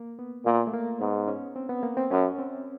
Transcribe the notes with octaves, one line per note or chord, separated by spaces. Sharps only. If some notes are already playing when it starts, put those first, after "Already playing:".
Already playing: A#3
B3
A#2 A#3
A3
A#3
G#2 B3
C#4
C4
B3
A#3
C4
F#2 C#4
C4